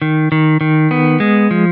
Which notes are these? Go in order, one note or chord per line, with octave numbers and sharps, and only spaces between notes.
D#3
D#3
D#3
B3
G#3
F3